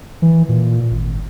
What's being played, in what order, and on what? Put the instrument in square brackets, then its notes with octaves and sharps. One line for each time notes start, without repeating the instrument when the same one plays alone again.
[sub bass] E3
A#2
G#1